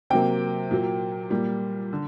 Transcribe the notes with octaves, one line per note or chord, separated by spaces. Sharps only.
C3 F#3 A#3 G5
A#2 F#3 A#3
A#2 G3 A#3
D3